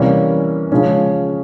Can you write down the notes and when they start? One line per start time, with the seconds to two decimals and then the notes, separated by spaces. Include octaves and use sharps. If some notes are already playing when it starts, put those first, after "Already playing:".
Already playing: C3 E3 G3 A#3 C#4
0.72 C#3 F3 G#3 C#4